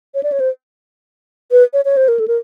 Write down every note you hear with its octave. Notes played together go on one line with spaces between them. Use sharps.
C#5
D5
C#5
C5
B4
C#5
C#5
C5
A#4
A4
A#4